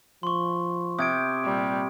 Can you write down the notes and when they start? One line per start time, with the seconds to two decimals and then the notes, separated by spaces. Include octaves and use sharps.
0.23 F3 C6 C#6
0.98 C3 D#6 G#6 D7
1.45 A#2 G3